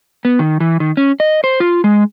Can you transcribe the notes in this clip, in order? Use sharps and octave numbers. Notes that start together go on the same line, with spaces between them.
B3
D#3
E3
D#3
C#4
D#5
C5
F4
G#3